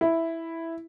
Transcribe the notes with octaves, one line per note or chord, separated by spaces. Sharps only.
E4